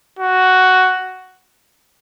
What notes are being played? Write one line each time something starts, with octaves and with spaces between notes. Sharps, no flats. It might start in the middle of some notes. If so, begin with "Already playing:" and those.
F#4